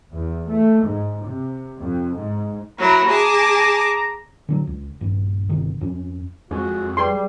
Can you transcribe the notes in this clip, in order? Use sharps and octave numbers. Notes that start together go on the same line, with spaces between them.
E2
A3
G#2
C3
F2
G#2
F#3 E4 A#4 A#5
G#4 A5 D6
D3 F3 F#3
C#2
A#1 G2
G1 C3 D#3
F2 C#4
F2 G#3 F#4
G3 G#4 B4 G5 C6
G3